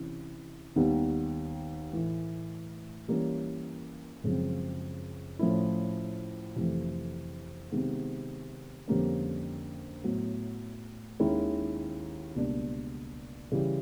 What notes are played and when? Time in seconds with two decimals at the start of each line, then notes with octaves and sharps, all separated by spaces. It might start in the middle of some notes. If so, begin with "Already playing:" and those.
Already playing: C3 E3 C#4 E4
0.76 D#2 D#3 G3 B3
1.92 A2 E3 A3
3.08 E3 G3 A#3 C#4
4.24 F#2 C#3 F3 G#3 C4
5.39 A2 F3 A3 C#4 E4
6.56 F2 C3 E3 A3
7.72 C3 D#3 G#3 B3
8.88 F2 D3 G3 A#3 C#4
10.04 A2 F#3 B3
11.20 D#2 D#3 G#3 C#4 E4
12.36 C#2 B2 G3 A#3 D4
13.51 C#3 E3 G3